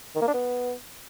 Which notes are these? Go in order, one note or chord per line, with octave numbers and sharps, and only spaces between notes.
D#3
A#3
D4
B3